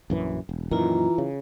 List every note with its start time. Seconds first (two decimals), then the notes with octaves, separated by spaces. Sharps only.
0.10 A#1 F#2 E3
0.49 E1
0.71 F#2 A#2 D#3 E3 F4 A#5
1.18 C#3